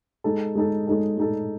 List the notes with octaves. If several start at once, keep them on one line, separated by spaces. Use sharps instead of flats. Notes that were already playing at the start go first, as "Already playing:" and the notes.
G#3 D#4 A4
G#3 D#4 A4
G#3 D#4 A4
G#3 D#4 A4